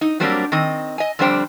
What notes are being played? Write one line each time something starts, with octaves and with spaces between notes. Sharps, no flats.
D#4
F#3 G3 A#3 C4 D4 G4
D#3 C4 D#5
D#5 G#5
F2 D3 G3 D4 C5 G5